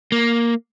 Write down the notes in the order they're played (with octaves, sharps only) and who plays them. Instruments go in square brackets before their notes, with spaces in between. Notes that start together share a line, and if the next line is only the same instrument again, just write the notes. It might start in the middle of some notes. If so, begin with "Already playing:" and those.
[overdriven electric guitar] A#3